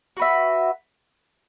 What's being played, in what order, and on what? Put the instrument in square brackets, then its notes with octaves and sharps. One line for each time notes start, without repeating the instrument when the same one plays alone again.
[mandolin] F#4 B4 E5